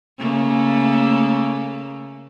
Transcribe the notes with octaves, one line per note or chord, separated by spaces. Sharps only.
C#3 A3 A#3